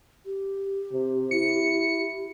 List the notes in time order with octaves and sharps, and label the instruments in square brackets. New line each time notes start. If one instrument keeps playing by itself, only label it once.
[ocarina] G4
[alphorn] C3
[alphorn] E4 [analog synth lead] C#7